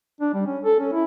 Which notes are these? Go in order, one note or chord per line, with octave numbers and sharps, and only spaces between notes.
D4
G3
C#4
A4
C#4
E4